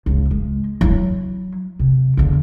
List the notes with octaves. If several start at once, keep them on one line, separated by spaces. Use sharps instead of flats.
C#2
G#3
F#3 E4
C3
E2 D3